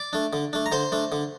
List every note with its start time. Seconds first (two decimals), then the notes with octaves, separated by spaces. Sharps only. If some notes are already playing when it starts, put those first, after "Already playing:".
Already playing: D5 D6
0.13 A3 D4
0.33 D3
0.53 A3 D4
0.66 A#5
0.72 D3 C5 C6
0.92 A3 D4
1.12 D3